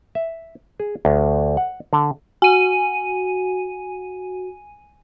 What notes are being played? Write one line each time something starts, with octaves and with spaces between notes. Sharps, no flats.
E5
G#4
D2
F#5
D3
F#4 G#5 D#7